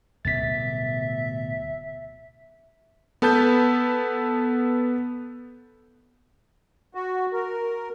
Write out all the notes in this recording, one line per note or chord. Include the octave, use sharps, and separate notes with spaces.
D1 B2 G3 E5 A6 B6
B3 A4 B4 A5 G6
F#4
A#4